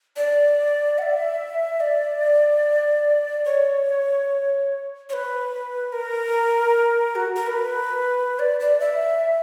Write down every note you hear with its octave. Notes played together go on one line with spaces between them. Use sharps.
D5
F#5
E5
D5
C#5
C#5
B4
A#4
F#4
A#4
B4
D5
D5
E5